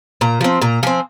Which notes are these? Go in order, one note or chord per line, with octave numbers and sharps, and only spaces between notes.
A#2 A#5
F3 C4
A#2 A#5
F3 C4 G#5